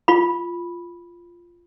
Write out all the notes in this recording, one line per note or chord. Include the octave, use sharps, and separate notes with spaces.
F4 B5